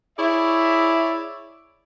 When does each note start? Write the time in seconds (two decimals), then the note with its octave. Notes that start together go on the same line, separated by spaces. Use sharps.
0.19 E4 G#4 C#5 D5 E5